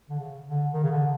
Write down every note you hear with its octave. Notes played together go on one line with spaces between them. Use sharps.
D3
C#3
D3
D#3
C#3
D3